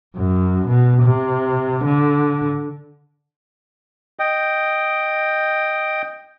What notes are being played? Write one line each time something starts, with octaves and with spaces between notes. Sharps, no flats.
F#2
B2
C3
D3
D#5 G5